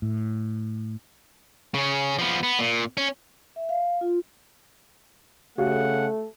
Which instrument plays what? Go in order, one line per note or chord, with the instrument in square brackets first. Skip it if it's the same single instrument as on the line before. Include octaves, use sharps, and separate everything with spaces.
[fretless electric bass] A2
[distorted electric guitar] C#3 C#4
F3 B3
B3
A#2
C#4
[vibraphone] E5
F5
F4
[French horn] C#3 [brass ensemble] A3 [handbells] F#4 G4 F5 [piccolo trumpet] F#5